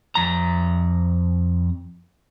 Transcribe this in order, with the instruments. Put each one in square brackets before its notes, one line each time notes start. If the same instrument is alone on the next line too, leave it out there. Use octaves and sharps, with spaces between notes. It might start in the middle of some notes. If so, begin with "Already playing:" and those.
[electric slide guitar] F2 A#5